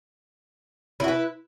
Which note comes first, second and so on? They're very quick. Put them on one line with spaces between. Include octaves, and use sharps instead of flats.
E4 F#4 B4